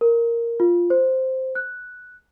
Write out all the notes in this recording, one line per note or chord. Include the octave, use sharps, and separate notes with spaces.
A#4
F4
C5
F#6